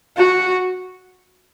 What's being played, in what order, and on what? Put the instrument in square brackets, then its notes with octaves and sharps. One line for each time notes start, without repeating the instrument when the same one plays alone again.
[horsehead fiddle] F#4